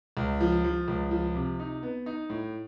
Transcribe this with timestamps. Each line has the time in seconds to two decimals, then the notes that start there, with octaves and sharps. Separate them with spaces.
0.17 C#2
0.40 F3
0.64 F3
0.88 C#2
1.11 F3
1.35 C3
1.59 D#4
1.83 B3
2.06 D#4
2.30 A2